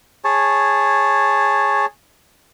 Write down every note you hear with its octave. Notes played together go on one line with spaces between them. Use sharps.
G#4 C#5 A5